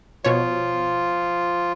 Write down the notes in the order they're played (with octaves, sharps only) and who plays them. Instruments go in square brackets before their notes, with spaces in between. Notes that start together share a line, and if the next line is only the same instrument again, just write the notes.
[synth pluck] B2 C#5 [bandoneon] F3 F4